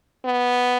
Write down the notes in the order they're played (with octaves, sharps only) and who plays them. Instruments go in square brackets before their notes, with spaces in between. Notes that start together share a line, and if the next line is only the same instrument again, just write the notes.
[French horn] B3